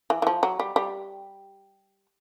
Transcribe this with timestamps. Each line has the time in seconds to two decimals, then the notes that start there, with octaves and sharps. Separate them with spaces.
0.10 E3
0.22 E3
0.27 F3
0.43 F#3
0.60 G3
0.76 G3